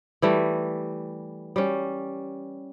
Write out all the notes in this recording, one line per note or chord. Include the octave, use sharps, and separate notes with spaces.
E3 G3 A3
G3 C#4